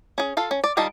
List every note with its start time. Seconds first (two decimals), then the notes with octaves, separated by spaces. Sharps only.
0.18 C#4 G#4
0.37 F4 A4 F5
0.51 C#4
0.64 D5
0.77 D#3 G3 F4 D#5 A5